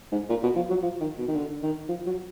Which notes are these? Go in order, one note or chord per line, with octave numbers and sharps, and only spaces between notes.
G#2
A#2
B2
F3
F#3
F3
D#3
B2
D#3
D3
D#3
F3
F#3